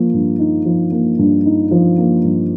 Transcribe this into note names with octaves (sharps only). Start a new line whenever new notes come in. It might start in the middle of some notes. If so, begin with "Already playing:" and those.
Already playing: F3 A#3
G2
D#4
F3
A#3
G2
D#4
F3
A#3
G2